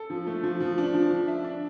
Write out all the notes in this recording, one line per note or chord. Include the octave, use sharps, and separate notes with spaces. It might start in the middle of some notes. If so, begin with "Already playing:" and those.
Already playing: A4
F3
A3
F3
F3
D4
F3
D4
E5
D4